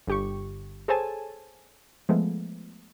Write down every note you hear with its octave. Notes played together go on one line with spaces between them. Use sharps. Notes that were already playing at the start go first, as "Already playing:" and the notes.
G1 G4 C#6
G#4 A4 C5 C#5 G#5 A5
F3 G#3 A3 B3